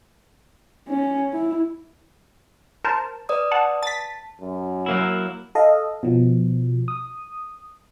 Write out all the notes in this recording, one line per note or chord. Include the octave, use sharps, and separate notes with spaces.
C#4
E4
A#4 C5 A5
B4 D5 D#6
F#5 A5
A5 A6 B6
F#2
F#3 A#3 E4
A4 D#5 F5
B2 F3
D#6